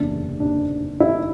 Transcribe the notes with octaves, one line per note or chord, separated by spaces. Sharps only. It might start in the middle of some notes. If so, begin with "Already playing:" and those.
Already playing: F#1 E2 C3 D4
D4
E4